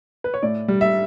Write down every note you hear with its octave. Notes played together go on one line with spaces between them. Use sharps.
B4
C#5
A2 D5
G3
E5